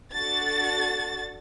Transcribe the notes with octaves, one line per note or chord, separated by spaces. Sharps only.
D4 F#4 A4 A6